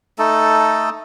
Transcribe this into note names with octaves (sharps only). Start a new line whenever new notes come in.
A3 D#4 A4